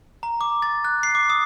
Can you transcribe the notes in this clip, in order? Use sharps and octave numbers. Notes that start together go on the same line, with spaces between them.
A#5
D6
A6
F#6
C7
D6
D#6